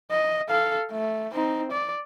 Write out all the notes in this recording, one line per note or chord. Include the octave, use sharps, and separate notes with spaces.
D#5
A4 F5
A3
C4 D#4
D5